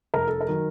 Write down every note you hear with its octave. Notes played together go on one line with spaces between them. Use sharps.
F1 A#4
A4
A#4
D#3 F#3